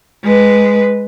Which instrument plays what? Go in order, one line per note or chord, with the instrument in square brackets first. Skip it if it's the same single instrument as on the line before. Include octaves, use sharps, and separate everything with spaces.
[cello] G#3 B4